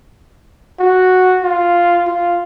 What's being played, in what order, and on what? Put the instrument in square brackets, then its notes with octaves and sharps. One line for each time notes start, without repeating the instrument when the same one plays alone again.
[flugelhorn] F#4
F4
F4